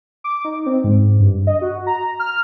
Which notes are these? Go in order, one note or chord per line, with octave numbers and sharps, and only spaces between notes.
D6
D#4
C4
G#2
G2
D#5
F#4
A#5
F6